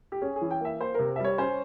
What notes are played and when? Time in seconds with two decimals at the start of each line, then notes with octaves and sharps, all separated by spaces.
0.12 G4
0.22 C#4 G#4
0.36 G#4
0.41 E3
0.51 G5
0.60 A#3 E5
0.80 A#3 C5
0.94 C3 A#4
1.16 E5
1.19 G3 C#5
1.38 C#4 C5